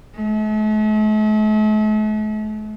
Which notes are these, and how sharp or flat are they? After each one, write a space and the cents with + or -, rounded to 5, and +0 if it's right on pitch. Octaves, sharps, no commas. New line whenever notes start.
A3 -45